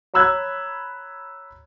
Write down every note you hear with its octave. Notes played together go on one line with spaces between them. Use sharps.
C#5 A#5 B5 E6 F#6 G#6